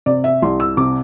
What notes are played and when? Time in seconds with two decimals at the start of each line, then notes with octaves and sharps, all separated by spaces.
0.06 C3 D5
0.24 E5
0.42 C2 C6
0.60 E6
0.77 C3 D6